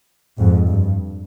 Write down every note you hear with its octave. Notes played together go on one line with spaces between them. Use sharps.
F2 G#2
G2